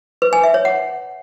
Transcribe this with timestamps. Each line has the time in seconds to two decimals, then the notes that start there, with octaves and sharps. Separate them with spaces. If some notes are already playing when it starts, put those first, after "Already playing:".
0.22 B4
0.33 G#5
0.43 E5
0.54 C#5
0.65 F#5